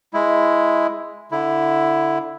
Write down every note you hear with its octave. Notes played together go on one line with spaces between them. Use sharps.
G#3 E4
D3 E4